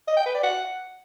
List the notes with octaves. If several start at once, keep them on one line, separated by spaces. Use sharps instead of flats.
D#5
G5
B4
D5
F#5